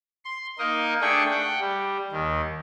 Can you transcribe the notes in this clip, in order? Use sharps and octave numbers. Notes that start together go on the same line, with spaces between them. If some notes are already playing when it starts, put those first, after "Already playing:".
C6
A#3 D#4 A#4 D#5
A3 D4 G#4 G5 C#6
F#5 G5
G3
D#2 D#3